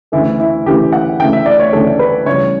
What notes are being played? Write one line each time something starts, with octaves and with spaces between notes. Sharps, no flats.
D2 C#3 E3 A3 E4
E4
D2 C#3 E3 A3 G4
F#5
D2 C#3 E3 A3 G5
E5
D5
C#5
D2 C#3 E3 A3 A4
B4
C#2 C#3 E3 G3 C#5